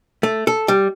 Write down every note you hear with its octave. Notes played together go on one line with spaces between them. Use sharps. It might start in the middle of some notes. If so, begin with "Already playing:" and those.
A3
A4
G3